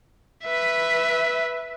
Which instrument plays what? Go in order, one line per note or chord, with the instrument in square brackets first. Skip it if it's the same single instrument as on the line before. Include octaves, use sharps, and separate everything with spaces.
[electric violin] B4 E5